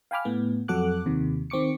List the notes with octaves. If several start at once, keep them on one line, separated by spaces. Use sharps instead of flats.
F5 G5 G#5 B5 D6 F6
A2 B3
F2 F#3 A4 F#5 D6 F#6
D#2 C3 D#3
D#3 C4 C#6 D6 C#7